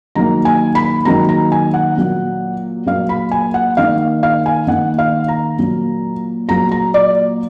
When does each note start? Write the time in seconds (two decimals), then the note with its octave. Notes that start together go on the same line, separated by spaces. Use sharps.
0.15 D#3 F#3 A#3 A#5
0.45 G#5
0.75 B5
1.05 D#3 F#3 A#3 A#5
1.29 A#5
1.52 G#5
1.74 F#5
1.97 A#2 F#3 A#3
2.86 A#2 F#3 A#3 F5
3.09 B5
3.31 G#5
3.54 F#5
3.77 D#3 A#3 F5
4.23 F5
4.46 G#5
4.67 D#3 A#3 F#5
4.99 F5
5.28 A#5
5.58 A#2 F#3 A#3
6.49 A#2 F#3 A#3 A#5
6.71 A#5
6.94 D5